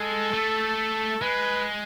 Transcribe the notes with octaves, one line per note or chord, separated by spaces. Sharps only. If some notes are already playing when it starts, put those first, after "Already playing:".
Already playing: G#3 A4
A3
G#3 B4